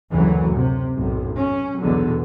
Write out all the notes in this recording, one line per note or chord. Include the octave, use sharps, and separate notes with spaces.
F#1 D2 E3 F#3
C3
B1 F#2 A2
C#4
B1 E2 B2 D3 F#3